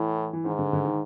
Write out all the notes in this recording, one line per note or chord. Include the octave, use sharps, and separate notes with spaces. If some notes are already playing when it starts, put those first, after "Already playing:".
Already playing: A2 E3
E3
G#2 D#3
D3
D3
D#3